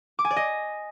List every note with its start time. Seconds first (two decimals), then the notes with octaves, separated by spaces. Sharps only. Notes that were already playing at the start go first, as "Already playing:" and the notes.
0.19 D6
0.25 G#5
0.31 D5
0.36 D#5